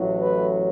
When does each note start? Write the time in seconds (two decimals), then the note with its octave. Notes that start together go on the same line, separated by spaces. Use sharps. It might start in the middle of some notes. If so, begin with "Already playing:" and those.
Already playing: A1 A2 F#3
0.20 B4